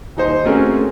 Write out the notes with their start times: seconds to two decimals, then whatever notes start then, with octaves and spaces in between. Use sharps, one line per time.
0.17 D#1 D#4 C5
0.45 A3 C4 C#4 F#4 G#4 A#4